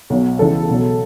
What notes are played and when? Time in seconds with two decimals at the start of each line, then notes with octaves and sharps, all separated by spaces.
0.10 B1 B2 F#3
0.39 C#2 C#3 E3 A4
0.69 B1 B2 F#3